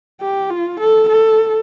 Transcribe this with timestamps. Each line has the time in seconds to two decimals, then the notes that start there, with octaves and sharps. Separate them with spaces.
0.21 G4
0.50 F4
0.80 A4
1.09 A4